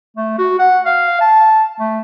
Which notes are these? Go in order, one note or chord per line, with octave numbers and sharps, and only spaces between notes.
A3
F#4
F#5
F5
A5
A3